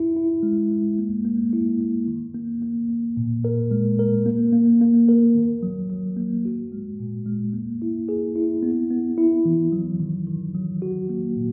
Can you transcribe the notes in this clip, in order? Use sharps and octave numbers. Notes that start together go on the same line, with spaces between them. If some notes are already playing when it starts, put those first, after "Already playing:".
Already playing: E4
E4
G#3
G#3
A#3
A#3
E4
A#3
D#3
A#3
A#3
A#3
A#2
A#4
G#3
A#4
A#3
A#3
A#3
A#4
D#3
F#3
F#3
A#3
F#4
G#3
A#2
G#3
A#3
E4
G#4
E4
B3
B3
E4
E3
F#3
D#3
D#3
F#3
F#4
A#3
A#2